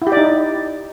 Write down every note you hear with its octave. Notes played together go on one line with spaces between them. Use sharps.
E4
G4
D5
D#4